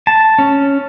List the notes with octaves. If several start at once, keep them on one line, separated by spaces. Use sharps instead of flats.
A5
C#4